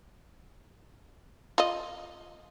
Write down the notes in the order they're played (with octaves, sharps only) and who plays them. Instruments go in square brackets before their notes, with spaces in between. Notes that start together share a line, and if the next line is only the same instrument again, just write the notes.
[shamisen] F4 D#5